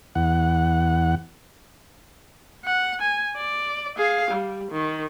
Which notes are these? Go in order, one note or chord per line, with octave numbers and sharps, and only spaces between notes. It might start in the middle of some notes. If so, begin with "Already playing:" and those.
E2 F#5
F#5
G#5
D5
G#4 F5
G3
D#3